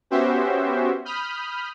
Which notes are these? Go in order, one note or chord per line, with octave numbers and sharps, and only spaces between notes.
B3 C#4 F#4 G4 C5 E5
B5 D#6 F6 G6